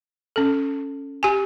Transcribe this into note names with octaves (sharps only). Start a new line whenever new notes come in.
C#4 A4
G4 G#5